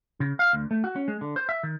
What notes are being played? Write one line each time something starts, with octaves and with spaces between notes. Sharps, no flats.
C#3
F5
D2
A3
F#4
C#4
G#3
D3
C5
E5
D#3